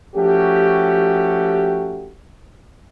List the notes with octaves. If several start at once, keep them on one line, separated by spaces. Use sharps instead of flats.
F3 A3 C#4 F#4 G4